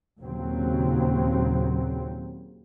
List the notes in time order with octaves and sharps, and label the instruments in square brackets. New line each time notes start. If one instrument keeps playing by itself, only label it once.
[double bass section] D#2 A#2 C#3 F#3 C4